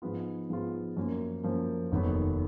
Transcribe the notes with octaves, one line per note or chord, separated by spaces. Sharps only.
G#2 F3 G#3 B3 F4
G#2 F3 G#3 B3 F4
F#2 F3 A#3
F#2 F3 A#3
F1 D#2 D#3 F#3 B3